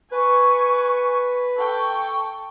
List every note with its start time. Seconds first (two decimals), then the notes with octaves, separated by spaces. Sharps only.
0.12 B4 G#5 C#6
1.57 A4 G5 C#6